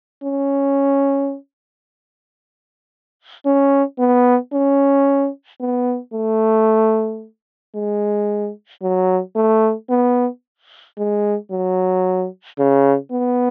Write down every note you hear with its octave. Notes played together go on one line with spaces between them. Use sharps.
C#4
C#4
B3
C#4
B3
A3
G#3
F#3
A3
B3
G#3
F#3
C#3
B3